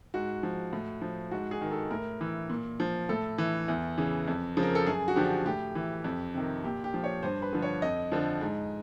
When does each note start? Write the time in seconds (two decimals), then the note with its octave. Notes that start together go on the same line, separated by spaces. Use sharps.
0.14 G#2 F#4
0.43 F3
0.73 A2
1.02 F3
1.31 G#2 F#4
1.51 G#4
1.61 D#3
1.71 A4
1.91 A2 A#4
2.21 E3
2.50 A#2
2.80 F3
3.09 A2 A4
3.38 E3
3.68 E2
3.98 C#3 E3
4.27 F2
4.57 C#3 F3
4.63 A#4
4.75 A4
4.86 F#2 G#4
5.08 F#4
5.16 D3 F3 G4
5.46 A2 G4
5.75 E3
6.04 F2
6.34 C3 D#3
6.64 A#2 G4
6.84 G4
6.94 F3
7.04 C#5
7.23 G2 C5
7.42 B4
7.53 D3 F3
7.62 C#5
7.82 F2 D#5
8.12 D3 F3
8.41 G#2